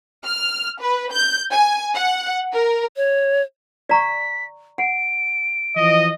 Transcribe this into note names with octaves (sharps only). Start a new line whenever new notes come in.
F6
B4
G6
G#5
F#5
A#4
C#5
D5 A#5 C#6 B6
F#5 D7
E3 F3 D#5